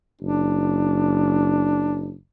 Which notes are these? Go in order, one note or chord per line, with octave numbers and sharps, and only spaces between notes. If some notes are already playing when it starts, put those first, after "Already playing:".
F#1 D4